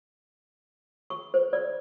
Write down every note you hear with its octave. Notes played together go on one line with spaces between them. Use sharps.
C#6
C5
D5